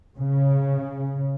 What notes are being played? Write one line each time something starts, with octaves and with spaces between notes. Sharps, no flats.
C#3